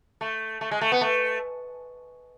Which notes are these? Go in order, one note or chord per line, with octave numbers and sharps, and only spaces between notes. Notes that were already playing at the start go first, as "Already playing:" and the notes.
A3
A3
G#3
A3
B3
A3